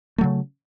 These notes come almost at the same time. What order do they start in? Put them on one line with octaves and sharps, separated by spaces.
A3 F#3 C#3